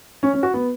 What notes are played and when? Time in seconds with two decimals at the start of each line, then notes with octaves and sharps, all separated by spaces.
0.23 C#4
0.34 C#4
0.43 F#4
0.54 B3